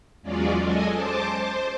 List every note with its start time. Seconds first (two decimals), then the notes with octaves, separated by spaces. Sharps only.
0.23 E2 F#3 G#3 C#4 F4 D5
0.60 G#3 A4 D#5 G#5
0.94 C5 A5 D6
1.37 C5